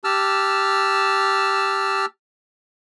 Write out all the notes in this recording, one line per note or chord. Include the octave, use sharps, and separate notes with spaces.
G4 A5 E6 F6